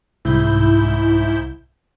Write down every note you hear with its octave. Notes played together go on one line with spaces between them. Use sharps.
C2 G#2 E4 G6